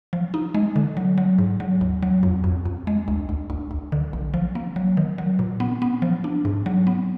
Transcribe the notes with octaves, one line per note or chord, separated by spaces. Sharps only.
F3
D#4
G#3
D3
F#3
F#3
G#2
F#3
D#2
F#3
F2
F2
F2
G#3
D2
D2
D2
D2
D3
A#1
F3
A#3
F#3
D#3
F#3
A#2
B3
B3
F3
D4
G#2
F#3
B3